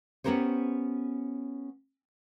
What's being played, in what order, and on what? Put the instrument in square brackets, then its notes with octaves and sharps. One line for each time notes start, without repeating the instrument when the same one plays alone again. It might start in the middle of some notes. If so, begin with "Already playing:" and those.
[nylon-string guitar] B3 C#4 G4 A#4 C5 C#5